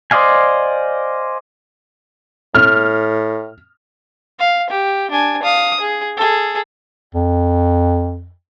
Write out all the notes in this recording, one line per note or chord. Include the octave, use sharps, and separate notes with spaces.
C5 D5 D#5 F5 G#5
A2 F6
F5
G4
D4 G#5
F5 D#6
G#4
G#4 A4
F2